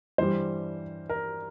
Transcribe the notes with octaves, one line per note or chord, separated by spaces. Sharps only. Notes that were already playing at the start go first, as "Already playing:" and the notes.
G2 E3 G3 C5
A#4